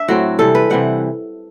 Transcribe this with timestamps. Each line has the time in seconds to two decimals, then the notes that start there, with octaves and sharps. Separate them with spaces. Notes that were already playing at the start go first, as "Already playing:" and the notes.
Already playing: D4 E5
0.08 A2 F#3 C4 F#4
0.39 C3 E3 G3 A4
0.55 B4
0.70 C3 E3 G3 F#5